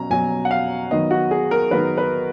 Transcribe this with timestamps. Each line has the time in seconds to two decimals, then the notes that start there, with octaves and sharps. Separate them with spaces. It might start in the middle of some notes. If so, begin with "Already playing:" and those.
Already playing: B2 F#3 C#4 A#5
0.10 B2 F#3 C#4 G#5
0.45 F#5
0.51 F5
0.91 D#3 F#3 B3 D#4 D#5
1.11 F#4
1.31 G#4
1.51 A#4
1.71 D#3 F#3 B3 D#4 B4
1.98 B4